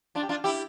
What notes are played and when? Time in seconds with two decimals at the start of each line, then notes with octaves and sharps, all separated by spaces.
0.15 D4 F4
0.23 G4
0.29 D4 F4
0.44 E4 G4